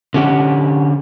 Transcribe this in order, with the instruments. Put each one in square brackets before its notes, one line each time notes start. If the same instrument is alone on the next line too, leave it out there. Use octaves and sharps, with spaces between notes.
[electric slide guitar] D3 C#4 G4 F#5